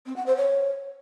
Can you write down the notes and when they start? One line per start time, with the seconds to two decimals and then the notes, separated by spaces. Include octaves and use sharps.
0.06 C4
0.16 F#5
0.26 C5
0.37 C#5